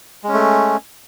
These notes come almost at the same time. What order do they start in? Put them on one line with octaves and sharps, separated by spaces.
G#3 C#4 A3